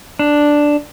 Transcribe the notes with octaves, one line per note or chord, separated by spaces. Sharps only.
D4